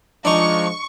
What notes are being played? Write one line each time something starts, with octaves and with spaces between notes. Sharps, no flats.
F3 G#3 D4 D#4 C#6